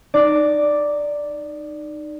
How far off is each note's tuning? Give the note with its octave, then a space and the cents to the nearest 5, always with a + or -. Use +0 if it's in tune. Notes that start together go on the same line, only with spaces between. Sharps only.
D#4 -25 D5 +0